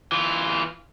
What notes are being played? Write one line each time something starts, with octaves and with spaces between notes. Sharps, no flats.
E3 F4